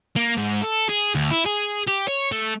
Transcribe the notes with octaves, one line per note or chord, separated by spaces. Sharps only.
A#3
G#2
A4
G#4
D2
E4
G#4
G4
C#5
A3